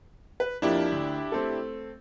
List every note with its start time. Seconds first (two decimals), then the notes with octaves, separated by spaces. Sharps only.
0.40 B4
0.62 F2 F3 A#3 D4 E4 G4
0.92 D2
1.32 A3 C4 A4